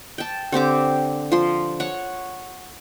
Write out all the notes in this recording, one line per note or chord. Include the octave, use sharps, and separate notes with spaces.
G5 A5
D3 C4 G4 D6
F3 C6
C#5 F#5